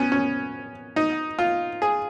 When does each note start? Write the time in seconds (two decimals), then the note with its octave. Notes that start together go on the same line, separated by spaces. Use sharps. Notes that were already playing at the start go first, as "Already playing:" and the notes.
Already playing: B3 C#4
0.12 C#4
0.96 D#4
1.39 F4
1.82 G#4